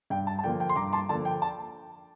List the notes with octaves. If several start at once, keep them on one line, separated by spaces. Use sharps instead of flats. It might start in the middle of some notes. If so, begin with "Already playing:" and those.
G2 G5
A5
A5
D3 F3 A#3 G5
G5
C6
G2 A#5 D6
A5 C6
D3 F3 A#3 A5
G5
A5